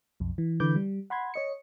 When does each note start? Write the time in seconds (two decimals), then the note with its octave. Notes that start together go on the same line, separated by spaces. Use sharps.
0.20 B1 F2
0.38 E3
0.60 D3 E3 B4 D6 G6
0.76 G3
1.10 F#5 B5 C6 G#6
1.34 C#5 D#5 C#7